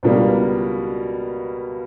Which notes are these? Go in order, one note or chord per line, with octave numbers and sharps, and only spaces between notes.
C#2 B2 G3 A#3 D4